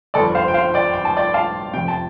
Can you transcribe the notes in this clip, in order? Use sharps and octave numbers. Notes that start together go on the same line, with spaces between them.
G1 F2 F3 A4 D5
C5 F5
G5
C5 F5
D5 G5
G5
A5
D5 G5
F5 A5
F1 F2 C3 G5
A5